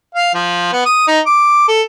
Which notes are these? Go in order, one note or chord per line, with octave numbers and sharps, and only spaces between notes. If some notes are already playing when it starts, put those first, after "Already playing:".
F5
F3
B3
D#6
D#4
D6
A4